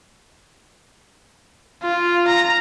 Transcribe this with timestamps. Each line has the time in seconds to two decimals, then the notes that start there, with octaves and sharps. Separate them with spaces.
1.83 F4
2.27 A#5